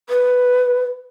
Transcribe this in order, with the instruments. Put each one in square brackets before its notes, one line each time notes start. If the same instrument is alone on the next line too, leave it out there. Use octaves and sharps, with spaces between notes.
[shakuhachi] B4